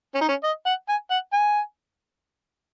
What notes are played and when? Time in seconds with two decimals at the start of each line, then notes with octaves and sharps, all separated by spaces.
0.15 C#4
0.21 D#4
0.28 C#4
0.44 D#5
0.66 F#5
0.89 G#5
1.11 F#5
1.33 G#5